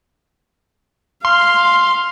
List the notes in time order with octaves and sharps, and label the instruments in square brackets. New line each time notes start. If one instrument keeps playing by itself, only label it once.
[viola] F5 [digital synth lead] C6